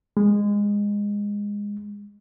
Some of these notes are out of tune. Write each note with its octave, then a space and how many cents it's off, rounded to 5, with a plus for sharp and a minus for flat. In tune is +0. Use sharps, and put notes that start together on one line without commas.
G#3 -20